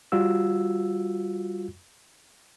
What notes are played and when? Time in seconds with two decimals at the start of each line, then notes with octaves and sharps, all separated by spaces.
0.12 G3 F4 F#4 E6